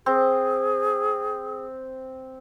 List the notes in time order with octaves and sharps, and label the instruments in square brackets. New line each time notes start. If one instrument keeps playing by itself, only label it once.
[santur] C4 [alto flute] G#4